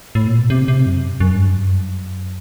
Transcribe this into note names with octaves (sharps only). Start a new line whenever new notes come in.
A2
A#2
B2
C3
C3
F#2
F#2
G2
F#2